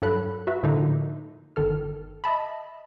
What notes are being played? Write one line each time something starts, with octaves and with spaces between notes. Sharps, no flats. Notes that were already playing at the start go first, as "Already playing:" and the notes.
G2 F#3 A4 B5 F#6
F#4 B4 E5
A2 D3 F3 A#3 D#4
G1 D#3 A4 F6
D#5 E5 A5 B5